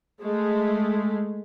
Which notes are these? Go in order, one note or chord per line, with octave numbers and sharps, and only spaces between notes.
G#3 A3